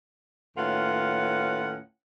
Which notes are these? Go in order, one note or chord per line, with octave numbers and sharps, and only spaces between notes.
D#2 A2 C#4 F4 B4 F#5